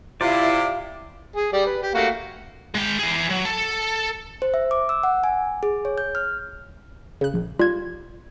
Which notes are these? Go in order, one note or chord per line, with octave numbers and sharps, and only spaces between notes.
C3 E4 F4 D5 E5 F5
G#4
G3 D5
B4
G4
A3 A#3 F#4
G#3 G5
E3 G#4
F#3
A4
C5
E5
D6
E6
F#5
G#5
G#4
C#5
G6
F6
C#3 F#6
A#1
G3 F4 G#6